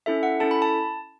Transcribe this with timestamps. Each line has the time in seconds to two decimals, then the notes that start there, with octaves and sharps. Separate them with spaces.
0.06 C#4 E4 A4 E5
0.23 F#5
0.40 C#4 E4 A4 A5
0.51 B5
0.62 A5